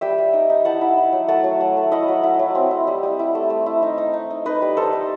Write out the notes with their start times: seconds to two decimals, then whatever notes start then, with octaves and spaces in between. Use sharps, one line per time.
0.01 G3 E5 G5
0.18 G3
0.33 D#4
0.50 D#4
0.65 E4 F#5 A5
0.81 E4
0.97 E4
1.13 F#3
1.28 A3 F#5 A5
1.44 F#3
1.61 A3
1.77 A3
1.92 E4 D#5 F#5
2.08 F#3
2.23 E4
2.39 F#3
2.55 C4
2.71 E4
2.87 G3
3.03 G3
3.19 E4
3.35 A3
3.50 A3
3.66 E4
3.82 D#4
3.98 D#4
4.13 D#4
4.30 D#4
4.46 D#4 B4 D#5
4.62 G3
4.77 D#4 A4 C5
4.93 D#4